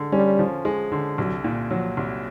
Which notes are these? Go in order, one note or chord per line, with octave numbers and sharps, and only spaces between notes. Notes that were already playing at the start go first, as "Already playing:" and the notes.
Already playing: D3 G#3
G3 C#4
F3
G#3
D3
C2 F#3
A#2
F3 F#3
C2